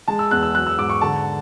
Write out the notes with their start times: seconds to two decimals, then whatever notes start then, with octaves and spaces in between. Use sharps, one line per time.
0.08 G#3 A5
0.19 E6
0.31 E2 F#6
0.43 E6
0.55 F#3 F#6
0.67 E6
0.78 G#2 D6
0.90 C#6
1.01 D3 A5